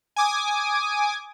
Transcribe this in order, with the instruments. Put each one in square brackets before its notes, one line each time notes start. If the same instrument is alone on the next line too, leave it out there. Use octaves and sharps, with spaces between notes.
[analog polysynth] G#5 D6 D#6